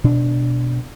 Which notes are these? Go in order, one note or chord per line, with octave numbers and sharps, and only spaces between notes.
B2 D4